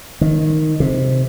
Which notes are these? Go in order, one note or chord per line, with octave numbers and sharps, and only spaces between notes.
D#3
C3